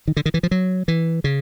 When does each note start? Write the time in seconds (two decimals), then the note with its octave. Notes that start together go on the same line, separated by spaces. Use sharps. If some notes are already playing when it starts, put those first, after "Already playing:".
0.08 D#3
0.17 D3
0.26 D#3
0.34 E3
0.43 F3
0.51 F#3
0.88 E3
1.24 C#3